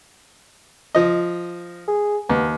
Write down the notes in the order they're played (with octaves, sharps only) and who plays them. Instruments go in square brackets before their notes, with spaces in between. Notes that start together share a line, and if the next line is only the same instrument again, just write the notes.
[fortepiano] F3 D#5
[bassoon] G#4
[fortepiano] D#2 [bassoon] B3